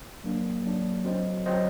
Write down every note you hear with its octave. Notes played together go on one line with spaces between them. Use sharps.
F#3 A#3 D4
F#3 A#3 D4
F#3 C4 F#4 C5 D#5
F#3 C4 F#4 C5 D#5